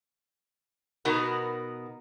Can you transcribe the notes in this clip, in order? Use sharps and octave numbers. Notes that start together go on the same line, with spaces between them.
B2 B3 D#4 F#4 A#4